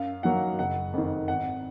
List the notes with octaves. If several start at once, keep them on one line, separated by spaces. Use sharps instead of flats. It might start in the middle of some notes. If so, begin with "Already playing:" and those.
Already playing: F#2 F5
D#3 F#3 A#3 F#5
F#1 F#5
F2 D#3
G#1 F#5